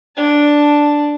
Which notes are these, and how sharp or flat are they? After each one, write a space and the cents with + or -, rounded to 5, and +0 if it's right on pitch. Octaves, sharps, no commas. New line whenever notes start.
D4 +0 A5 +0